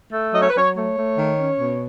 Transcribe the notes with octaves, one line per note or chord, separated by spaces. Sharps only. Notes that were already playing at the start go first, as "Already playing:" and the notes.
A3
F#3 D#5
C#5
B4
F#3 C#5
A3 C#5
A3
D#3
C#4
B2